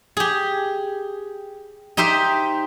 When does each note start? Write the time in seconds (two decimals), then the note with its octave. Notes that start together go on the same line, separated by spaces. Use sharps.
0.17 G4 G#4
1.97 D#4 G4 C5 E5 G5